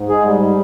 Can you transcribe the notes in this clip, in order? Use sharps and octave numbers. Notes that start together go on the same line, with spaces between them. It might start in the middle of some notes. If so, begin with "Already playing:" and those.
Already playing: G#2
G#3 G#4
G3